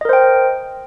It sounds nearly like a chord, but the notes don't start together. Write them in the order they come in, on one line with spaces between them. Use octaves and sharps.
D#5 A#4 C5 G5